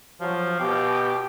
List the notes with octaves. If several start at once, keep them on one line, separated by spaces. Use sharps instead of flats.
F3 F#3
B2 G4